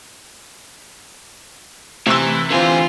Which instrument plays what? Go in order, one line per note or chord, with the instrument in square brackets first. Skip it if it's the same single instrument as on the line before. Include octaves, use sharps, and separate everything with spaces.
[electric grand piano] C3 E6 [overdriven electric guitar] E3 [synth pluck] A3 C6
[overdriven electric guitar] D3 G#5 [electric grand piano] E3 C4 [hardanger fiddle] F4